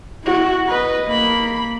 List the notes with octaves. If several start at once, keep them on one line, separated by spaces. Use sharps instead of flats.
E4 F#4
B4 D#5
A#3 B5